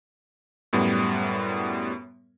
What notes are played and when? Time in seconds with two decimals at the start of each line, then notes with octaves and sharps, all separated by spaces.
0.73 F#2 A2 G3 B3